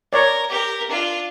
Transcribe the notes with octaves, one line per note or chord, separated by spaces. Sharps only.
A#4 C#5 D5
G4 A#4
D4 F4